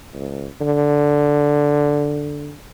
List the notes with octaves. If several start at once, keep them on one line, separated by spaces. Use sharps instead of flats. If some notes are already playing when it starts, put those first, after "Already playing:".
C#2
D3